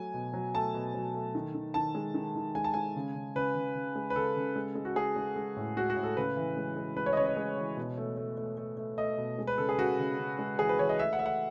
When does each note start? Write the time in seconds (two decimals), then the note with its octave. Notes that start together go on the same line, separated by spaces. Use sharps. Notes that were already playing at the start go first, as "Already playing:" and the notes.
Already playing: F#3 A3 G#5
0.14 B2
0.34 F#3
0.54 A3 A5
0.74 B2
0.94 F#3
1.14 A3
1.35 D#3
1.54 D#3
1.74 D#3 A5
1.95 G#3
2.14 D#3
2.35 D#3
2.55 G#3 G#5
2.64 A5
2.74 G#3 G#5
2.96 C#3
3.15 C#3
3.35 C#3 B4
3.55 C#3
3.75 C#3
3.96 G#3
4.10 B4
4.16 C#3 A4
4.36 C#3
4.56 G#3
4.75 G#3
4.85 F#4
4.96 G#3 G#4
5.16 G#3
5.36 G#3
5.56 A2
5.77 G#3 F#4
5.90 F#4
5.96 A2
6.03 A4
6.17 C#3 B4
6.37 E3
6.57 G#3
6.76 G#3
6.97 G#3 B4
7.06 C#5
7.13 D#5
7.17 C#3 C#5
7.26 D#5
7.37 G#3
7.57 E3
7.77 B2
7.98 A3
8.17 A3
8.37 A3
8.57 A3
8.77 A3
8.98 A3 D#5
9.18 B2
9.38 G#3
9.47 B4
9.58 C#3 A4
9.69 G#4
9.78 C#3 F#4
9.99 C#3
10.18 C#3
10.39 G#3
10.59 E3 G#4
10.69 B4
10.78 E3 C#5
10.89 D#5
10.99 A3 E5
11.13 F#5
11.19 A3 E5
11.26 F#5